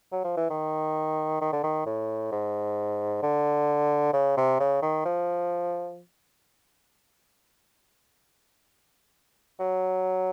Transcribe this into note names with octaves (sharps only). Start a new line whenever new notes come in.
F#3
F3
E3
D#3
D#3
D3
D#3
A2
G#2
D3
C#3
C3
C#3
D#3
F3
F#3